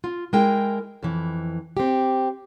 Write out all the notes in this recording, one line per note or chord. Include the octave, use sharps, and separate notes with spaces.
F4
G#3 E4 A#4 G5
F2 E3
C4 G4